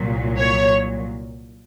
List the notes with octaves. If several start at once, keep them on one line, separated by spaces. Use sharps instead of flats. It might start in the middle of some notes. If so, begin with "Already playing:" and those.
Already playing: C2 A#2 F#3
C#5